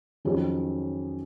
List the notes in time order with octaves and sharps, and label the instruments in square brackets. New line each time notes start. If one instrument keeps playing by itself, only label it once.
[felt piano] F2 D#3 F#3 C#4 G#4